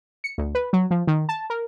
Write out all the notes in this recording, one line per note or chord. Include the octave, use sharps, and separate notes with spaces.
C#7
D2
B4
F#3
F3
D#3
A5
A#4